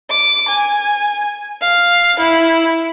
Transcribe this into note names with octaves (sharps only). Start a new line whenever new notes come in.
D6
G#5
F5
E4